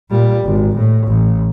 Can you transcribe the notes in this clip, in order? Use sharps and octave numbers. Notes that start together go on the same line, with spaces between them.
A#2 G3
G#1
A2
A1